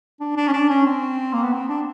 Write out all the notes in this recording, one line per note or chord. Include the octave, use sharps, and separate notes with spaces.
D4
D4
C#4
D4
C#4
C4
A#3
B3
C4
D4